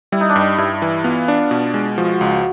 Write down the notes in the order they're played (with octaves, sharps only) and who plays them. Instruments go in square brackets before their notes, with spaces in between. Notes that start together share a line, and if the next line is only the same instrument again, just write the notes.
[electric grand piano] G3 [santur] E4
[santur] D#4
D4
[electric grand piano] G2 [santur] D#4
[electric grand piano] G2 [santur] E4
[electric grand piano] E3
[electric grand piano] B3 [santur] F4
[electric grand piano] D4
B2
G#3
[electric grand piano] F3 [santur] F#4
[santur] F4
F#4
[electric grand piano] C#2